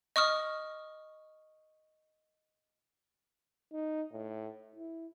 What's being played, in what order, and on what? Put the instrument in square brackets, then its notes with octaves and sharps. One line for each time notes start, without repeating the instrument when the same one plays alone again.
[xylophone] D#5 C#6 D#6 F6
[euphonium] D#4
A2
E4